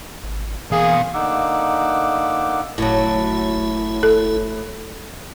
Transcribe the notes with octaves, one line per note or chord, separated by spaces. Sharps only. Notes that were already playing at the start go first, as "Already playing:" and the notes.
G#1
B2 E3 A#3 G#4 F5
D3 A#3 D#4 F#5 D6 E6
F#1 A2 F#3 E4
A4